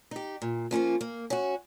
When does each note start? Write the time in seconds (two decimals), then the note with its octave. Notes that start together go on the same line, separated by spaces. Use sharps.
0.11 D#4 G4
0.42 A#2
0.71 F3 A#3 C#4 F4
1.01 A#3
1.30 C#4 F#4